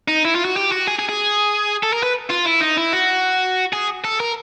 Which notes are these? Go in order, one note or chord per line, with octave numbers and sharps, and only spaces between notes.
D#4
E4
F4
F#4
G4
F#4
G#4
G#4
G#4
A4
A#4
B4
F4
E4
D#4
E4
F#4
G#4
A4
A#4